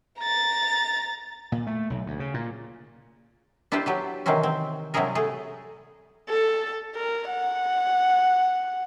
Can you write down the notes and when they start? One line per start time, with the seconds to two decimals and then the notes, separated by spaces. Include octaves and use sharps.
0.19 A#5 A6
1.52 A#2
1.67 A3
1.90 B1
2.06 D2
2.20 C#3
2.34 A#2
3.72 D4 E4 F4 G4 B4 C5
3.86 F#3 G4 B4
4.26 C3 D#3 E3 F#3 C4 C#4
4.43 C4
4.94 C3 F#3 G3 E4 G#4 A#4
5.15 A3 G#4
6.29 A4
6.95 A#4
7.29 F#5